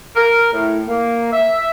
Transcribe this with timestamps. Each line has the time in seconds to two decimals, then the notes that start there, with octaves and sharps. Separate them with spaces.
0.16 A#4
0.53 A2
0.88 A#3
1.32 E5